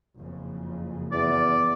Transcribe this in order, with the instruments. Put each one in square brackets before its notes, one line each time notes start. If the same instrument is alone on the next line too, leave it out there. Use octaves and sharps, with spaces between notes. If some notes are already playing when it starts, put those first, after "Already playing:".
[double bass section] F#1 F2 C#3
[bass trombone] E2 [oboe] D5